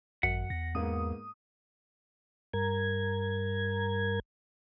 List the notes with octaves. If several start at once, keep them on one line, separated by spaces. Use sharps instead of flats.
G#1 F#2 F#5 B6
E2 A#6
G#2 A#3 B3 D#6
G2 A#4 G#6